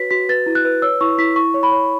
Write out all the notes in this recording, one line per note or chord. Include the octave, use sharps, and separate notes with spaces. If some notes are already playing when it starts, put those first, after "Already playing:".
Already playing: F#4 B4 C#5 B6
F#4 B6
B4 A6
E4
F#6
B4
C#5 E6
E4 C#6
E4 B6
E4 C#6
C#5
B5
C#5